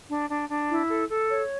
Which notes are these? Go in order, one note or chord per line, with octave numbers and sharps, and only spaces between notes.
D4
D4
D4
E4
A4
A4
C#5